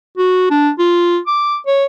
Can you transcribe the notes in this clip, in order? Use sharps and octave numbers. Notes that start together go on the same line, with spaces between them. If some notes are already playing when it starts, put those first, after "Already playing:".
F#4
D4
F4
D6
C#5